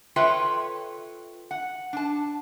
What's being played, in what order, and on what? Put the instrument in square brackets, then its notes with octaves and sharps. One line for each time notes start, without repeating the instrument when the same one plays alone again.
[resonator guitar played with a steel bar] F4 A4 B4 C#5 E5 G5
F#5
D4 A5